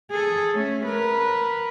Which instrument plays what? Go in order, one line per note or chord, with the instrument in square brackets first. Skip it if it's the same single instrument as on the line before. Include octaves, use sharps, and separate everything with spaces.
[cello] G#4 A4
A3 C#4
A#4 B4